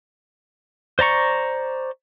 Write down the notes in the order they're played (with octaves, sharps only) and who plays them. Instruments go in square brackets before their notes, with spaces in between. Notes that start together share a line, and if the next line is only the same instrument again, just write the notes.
[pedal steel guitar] C5 D5 A#5 C#6